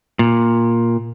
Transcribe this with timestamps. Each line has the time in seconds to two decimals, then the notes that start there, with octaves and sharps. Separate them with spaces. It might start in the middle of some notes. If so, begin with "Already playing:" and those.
0.19 A#2